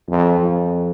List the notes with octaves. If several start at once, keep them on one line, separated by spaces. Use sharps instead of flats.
F2
F2